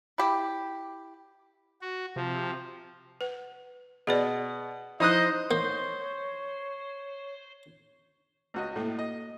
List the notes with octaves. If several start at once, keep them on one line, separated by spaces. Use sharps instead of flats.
E4 G4
F#4
C3 F3
B4 F#5
B2 G#4 B4 D5
F3 D#4 E4 C5 D#5 D#6 F#6
A#3 C5 C#5
C#2 F#4 D#5
A2 A#3 A4
D#5